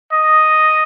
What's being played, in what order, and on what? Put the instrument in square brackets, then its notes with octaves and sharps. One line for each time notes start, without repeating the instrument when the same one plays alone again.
[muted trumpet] D#5